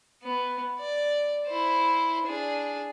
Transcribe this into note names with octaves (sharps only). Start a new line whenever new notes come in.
B3
D5
E4 C5
D4 G#4